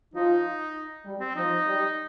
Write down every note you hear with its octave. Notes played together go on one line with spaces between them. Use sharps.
F3 D#4
G3
C4
F3 D#4
G3